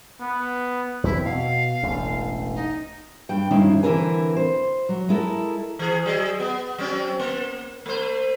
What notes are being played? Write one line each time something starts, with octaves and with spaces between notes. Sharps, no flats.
B3
E2 C4 E4
B2 F5
E1 A1 F#2
D#4
G2 G5
G2 D#3 F3 G#3 C#4 E4
D3 E3 C4 E4 A#4 G#5
C5
F#3
G#3 E4 A4 A#4
E3 G#4
F#3 G#4 D#5
B3
F#3 C4 C#4
A#3
A3 C5